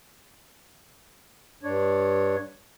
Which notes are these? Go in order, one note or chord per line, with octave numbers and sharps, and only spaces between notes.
G2 D4 C#5